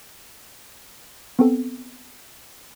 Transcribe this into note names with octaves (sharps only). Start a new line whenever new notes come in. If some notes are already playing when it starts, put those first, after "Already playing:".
B3 C4 A4